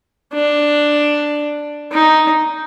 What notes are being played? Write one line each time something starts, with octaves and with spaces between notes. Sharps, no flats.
D4
D#4